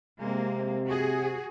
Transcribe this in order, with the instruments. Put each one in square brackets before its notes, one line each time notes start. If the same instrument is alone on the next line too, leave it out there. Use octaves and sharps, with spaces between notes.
[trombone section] C3 [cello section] G#3 A#3 C4
[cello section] F#4 G#4